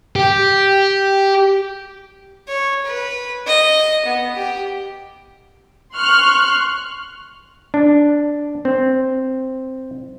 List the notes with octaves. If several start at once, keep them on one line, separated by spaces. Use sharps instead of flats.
G4
C#5
B4
D#5
B3
G4
C6 C#6 F6 F#6
D4
C4